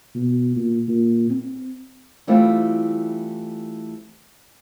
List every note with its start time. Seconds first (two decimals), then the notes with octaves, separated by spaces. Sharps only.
0.15 B2
0.56 A#2
0.88 A#2
1.30 C4
2.27 E3 G3 A3 C4 E4 F4